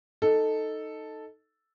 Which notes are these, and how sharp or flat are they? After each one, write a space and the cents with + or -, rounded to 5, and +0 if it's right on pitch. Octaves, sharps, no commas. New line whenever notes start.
D#4 +0 A4 +0